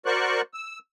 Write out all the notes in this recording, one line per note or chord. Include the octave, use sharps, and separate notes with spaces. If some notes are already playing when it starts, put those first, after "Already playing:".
F#4 A#4 C5 D5 C#6 F#6
E6